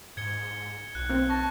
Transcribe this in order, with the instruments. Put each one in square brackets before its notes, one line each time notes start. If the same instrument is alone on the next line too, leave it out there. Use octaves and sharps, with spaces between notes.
[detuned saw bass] G#2 [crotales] G#6 C#7 G7
[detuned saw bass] B1 [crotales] F#6
[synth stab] A#3 C4
[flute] A5 [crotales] C#6 A#6